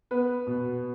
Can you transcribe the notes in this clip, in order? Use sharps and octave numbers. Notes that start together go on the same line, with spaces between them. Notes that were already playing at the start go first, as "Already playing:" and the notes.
B3 B4
B2